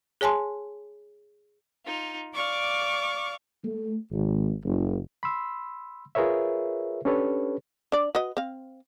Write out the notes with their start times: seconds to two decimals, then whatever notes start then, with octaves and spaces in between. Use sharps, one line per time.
0.21 G#4 C#5 G#5 A5 C6
1.86 D#4 F4
2.33 D5 F5 C#6 D6
3.65 A3
4.11 G#1
4.65 F#1
5.23 B5 C6 E6
6.15 F4 G#4 A#4 B4 C#5 E5
7.05 C#4 D4 G4 A4 B4 C#5
7.92 D4 D5
8.15 F#4 B4 D#5
8.37 C4 F5